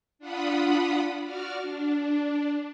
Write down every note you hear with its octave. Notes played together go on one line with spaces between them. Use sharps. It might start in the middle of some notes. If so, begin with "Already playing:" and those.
D4 F4 F#5 B5 D#6
F#4 D5 F6
D4